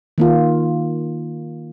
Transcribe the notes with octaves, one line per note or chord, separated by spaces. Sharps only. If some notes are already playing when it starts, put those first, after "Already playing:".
D#3 A#3 F4